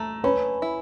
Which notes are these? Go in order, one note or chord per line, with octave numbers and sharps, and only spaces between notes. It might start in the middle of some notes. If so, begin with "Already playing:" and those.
Already playing: A3 A#5
C#4 B4 B5
E4